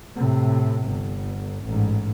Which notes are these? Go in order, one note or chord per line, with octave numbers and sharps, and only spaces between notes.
A2 C3
G1
A1 G#2